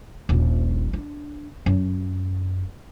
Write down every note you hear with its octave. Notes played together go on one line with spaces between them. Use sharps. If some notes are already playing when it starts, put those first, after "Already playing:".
D#1 A#1
D4
F#2